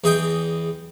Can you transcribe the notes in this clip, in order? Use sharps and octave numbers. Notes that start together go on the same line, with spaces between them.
E2 G#4 D#5 G5